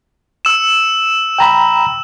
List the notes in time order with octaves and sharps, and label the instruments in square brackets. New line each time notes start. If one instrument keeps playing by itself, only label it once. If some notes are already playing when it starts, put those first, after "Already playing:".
[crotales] E6 E7
[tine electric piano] G5 A#5 B5